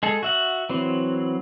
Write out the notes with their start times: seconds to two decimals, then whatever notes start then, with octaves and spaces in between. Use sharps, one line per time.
0.03 G#3 G#4 A4
0.23 F#4 E5 F#5
0.70 E3 F#3 C4